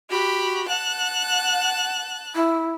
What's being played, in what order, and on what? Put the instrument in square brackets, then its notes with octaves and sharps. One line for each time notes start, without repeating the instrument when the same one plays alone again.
[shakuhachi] F#4 [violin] G4 B5
[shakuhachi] F#5 [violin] A5 F#6
[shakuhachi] E4